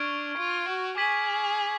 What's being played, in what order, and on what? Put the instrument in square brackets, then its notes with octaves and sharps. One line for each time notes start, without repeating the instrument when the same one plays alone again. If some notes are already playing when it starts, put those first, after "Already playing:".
Already playing: [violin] D4 [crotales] C#6 F6 G#6 D7 F7
[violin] F4
F#4
[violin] G#4 [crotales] D6 G#6 B6 F#7